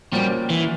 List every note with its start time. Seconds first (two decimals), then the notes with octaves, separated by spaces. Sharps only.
0.12 A#2 F3 G3 A#3 C#4 F#4
0.50 E3